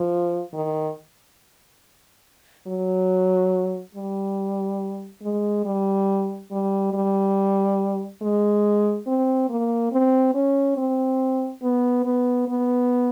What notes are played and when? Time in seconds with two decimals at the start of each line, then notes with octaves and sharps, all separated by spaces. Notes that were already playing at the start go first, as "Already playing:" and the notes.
Already playing: F3
0.53 D#3
2.67 F#3
3.95 G3
5.22 G#3
5.65 G3
6.51 G3
6.93 G3
8.22 G#3
9.07 C4
9.49 A#3
9.92 C4
10.34 C#4
10.77 C4
11.62 B3
12.05 B3
12.48 B3